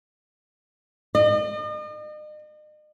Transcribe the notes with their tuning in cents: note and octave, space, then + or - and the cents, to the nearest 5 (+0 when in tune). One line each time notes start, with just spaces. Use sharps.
D#5 -40